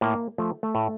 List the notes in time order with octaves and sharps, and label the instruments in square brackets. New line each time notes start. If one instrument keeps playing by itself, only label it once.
[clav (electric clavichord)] A2 A#3
F3 A3
A3
A2